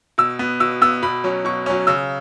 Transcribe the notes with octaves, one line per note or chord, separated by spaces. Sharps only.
B2 E6
B3
B2 E6
B3 E6
B2 B5
F#3 C#4
B2 C#6
F#3 C#4
C#3 E6